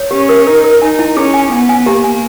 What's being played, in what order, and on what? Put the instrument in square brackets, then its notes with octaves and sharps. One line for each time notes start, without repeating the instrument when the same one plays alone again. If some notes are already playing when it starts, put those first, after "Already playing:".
Already playing: [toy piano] C#5
[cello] C#4 [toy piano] G4
[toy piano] A#4
[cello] D#4 [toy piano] A#4
[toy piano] A#4
[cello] D#4 [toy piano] G#5
[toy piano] E4
[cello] C#4 [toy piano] G#4
[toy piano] G#5
[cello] B3 [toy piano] G#5
[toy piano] G#5
[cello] A#3 [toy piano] G4
[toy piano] G#5